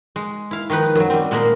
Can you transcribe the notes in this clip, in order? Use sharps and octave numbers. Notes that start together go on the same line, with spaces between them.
G#3
E4 F5
D#3 F3 D#4 B4
F#2 F#3
G3 C4
A#2 G#3 A#3 A#4 B5 C6